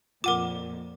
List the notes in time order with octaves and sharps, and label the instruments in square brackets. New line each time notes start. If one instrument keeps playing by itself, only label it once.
[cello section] F2 A#2 [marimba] F4 F#5 [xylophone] A#4 D6